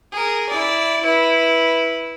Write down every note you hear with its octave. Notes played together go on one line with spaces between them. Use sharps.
G#4 A#4
E4 D5
E4 B4